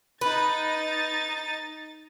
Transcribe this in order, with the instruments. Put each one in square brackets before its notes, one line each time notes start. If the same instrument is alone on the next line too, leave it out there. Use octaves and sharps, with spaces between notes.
[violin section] D#4 A6 [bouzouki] B4